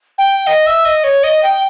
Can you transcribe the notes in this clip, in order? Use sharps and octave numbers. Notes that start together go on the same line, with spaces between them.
G5
D#5
E5
D#5
C#5
D#5
G5